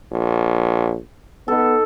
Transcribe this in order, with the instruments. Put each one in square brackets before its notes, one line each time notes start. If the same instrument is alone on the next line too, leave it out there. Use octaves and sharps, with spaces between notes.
[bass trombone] A#1
[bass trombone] B3 [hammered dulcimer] D#4 A4